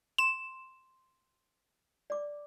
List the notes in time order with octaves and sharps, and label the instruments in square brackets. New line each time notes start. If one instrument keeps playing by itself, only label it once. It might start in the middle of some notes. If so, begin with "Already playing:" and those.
[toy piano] C6 [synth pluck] E7
[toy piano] D5 D6